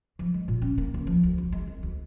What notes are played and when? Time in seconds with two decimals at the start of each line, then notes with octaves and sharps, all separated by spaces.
0.19 F3
0.34 G#3
0.48 A#2
0.62 C#4
0.78 A#3
0.94 C#2
1.07 F3
1.24 D2
1.38 E1
1.52 G#3
1.67 C2
1.83 D2